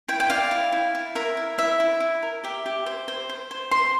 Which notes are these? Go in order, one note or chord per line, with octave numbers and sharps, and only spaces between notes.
E4 G5
G5
D5 F5
E4
E4
E4
A#4 E5
E4
E4 E5
E4
E4
A#4
G4 E5
G4
C5
C5
C5
C5
C5 C6